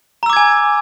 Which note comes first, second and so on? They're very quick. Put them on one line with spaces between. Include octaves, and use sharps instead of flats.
A#5 E6 D6 G#6 G#5